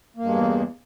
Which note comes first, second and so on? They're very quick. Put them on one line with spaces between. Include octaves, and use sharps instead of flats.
A#3 G2 G#3 E2